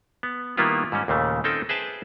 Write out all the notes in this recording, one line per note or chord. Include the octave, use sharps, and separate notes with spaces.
B3
D#3 G3 A#3 B3 E4 F4
G#2 G3 C#4
D#2 A#2 C#3 A3
C4 C#4 D#4 A4 G5
G#4 B4 C5 E5 G5 A5